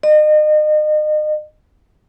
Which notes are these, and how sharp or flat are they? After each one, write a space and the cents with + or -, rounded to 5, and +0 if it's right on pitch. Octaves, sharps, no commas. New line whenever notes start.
D#5 -35